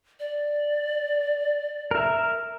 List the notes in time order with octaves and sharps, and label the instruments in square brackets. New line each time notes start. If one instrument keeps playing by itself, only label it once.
[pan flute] D5
[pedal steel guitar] A#4 E5